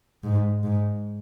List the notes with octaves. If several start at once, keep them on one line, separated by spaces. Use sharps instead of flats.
G#2
G#2